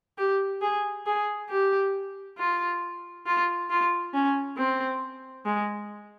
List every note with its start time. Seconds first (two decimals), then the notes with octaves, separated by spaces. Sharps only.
0.18 G4
0.62 G#4
1.06 G#4
1.50 G4
2.38 F4
3.26 F4
3.70 F4
4.14 C#4
4.57 C4
5.46 G#3